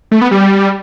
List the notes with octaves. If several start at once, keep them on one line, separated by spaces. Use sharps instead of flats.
A3
B3
G3